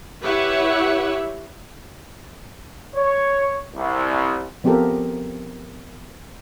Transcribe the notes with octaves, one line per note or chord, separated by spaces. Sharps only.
E4 G4 B4 C#5 E5 F#5
C#5
C2
F3 B3 C4 G4 A4 A#4